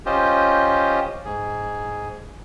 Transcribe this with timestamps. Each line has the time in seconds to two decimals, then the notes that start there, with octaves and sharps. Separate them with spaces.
0.06 C#4 F4 G4 C5 D#5
1.25 G#2 G#4